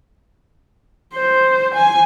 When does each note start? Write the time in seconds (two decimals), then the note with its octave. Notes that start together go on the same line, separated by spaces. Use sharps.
1.14 C5
1.74 G#5